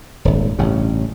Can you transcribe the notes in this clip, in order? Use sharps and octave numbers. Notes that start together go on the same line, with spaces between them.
D#1 G#1
A1 G2 C#3